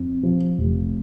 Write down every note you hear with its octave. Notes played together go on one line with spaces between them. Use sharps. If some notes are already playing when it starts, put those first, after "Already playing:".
Already playing: F2
F3
F1